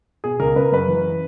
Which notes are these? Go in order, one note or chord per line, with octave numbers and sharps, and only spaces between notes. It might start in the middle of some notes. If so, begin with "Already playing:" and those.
B2 G#4
C#2 A#4
C#3 B4
A#4
F#2 B4
E3